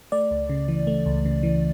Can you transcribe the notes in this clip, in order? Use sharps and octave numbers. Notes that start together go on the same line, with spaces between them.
A3 D5
C#2
C#3
E3
A3
C#2
C#3
E3